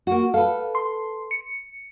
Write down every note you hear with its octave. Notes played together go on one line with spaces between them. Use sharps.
A#3 F#4
A4 B4 F5
C6
C#7